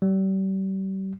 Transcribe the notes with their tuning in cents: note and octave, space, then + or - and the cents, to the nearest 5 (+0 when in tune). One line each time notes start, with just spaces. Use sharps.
G3 -35